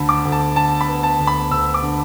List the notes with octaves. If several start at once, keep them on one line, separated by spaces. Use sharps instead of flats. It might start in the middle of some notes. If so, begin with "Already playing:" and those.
Already playing: D2 D3 A5 B5
D6
D2
A5
D3 A5
B5
B3
A5
D2
B5
D2 E6
D6
D3